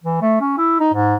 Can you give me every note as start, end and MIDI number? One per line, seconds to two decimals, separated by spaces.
0.04 0.19 52
0.22 0.40 57
0.41 0.56 61
0.58 0.78 64
0.80 0.92 63
0.94 1.15 44